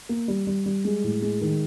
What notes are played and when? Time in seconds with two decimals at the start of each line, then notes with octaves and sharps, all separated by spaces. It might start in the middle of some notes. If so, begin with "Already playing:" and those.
0.09 A#3
0.28 G3
0.47 G3
0.66 G3
0.85 G#3
1.04 A2
1.22 G#3
1.41 D#3